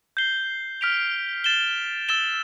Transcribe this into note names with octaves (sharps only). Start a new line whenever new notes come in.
G6 C7 G7
F6 B6 D7 F7
A6 E7 G7
E6 A6 E7 G7